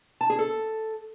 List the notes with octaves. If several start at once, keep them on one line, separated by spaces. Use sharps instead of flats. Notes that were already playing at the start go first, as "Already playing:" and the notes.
A5
G#4
A4